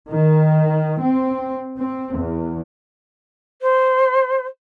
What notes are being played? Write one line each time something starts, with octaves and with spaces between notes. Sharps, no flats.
D#3
C4
C4
E2
C5